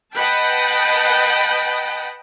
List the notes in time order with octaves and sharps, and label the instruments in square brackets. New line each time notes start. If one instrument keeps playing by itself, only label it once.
[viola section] B4 D#5 F#5 G5 A5